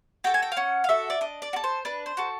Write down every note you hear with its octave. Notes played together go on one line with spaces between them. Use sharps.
F#4 A4 G5
G#5
G5
F5
C#4 F#5
F5
F#4 A4 E5
D5
D4 D#5
D5
F#4
A4
C5
D4 B4
C5
F#4 A4